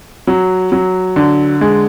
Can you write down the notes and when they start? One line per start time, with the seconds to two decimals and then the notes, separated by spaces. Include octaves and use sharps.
0.27 F#3
0.72 F#3
1.16 D3
1.61 G#3